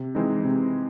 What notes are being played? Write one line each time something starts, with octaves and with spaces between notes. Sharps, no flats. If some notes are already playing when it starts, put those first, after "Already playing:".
Already playing: C3
E3 G#3 C4 D#4
C3